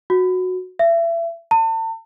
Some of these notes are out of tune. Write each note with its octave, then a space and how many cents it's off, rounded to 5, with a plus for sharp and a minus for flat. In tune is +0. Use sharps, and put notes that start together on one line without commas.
F#4 -10
E5 +30
A5 +40